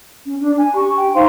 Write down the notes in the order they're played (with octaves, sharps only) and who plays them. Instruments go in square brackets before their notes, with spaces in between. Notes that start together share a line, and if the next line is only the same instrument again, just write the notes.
[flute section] C#4
D4
G#5
G4 C#6
G5
D#4 C5 F5 C6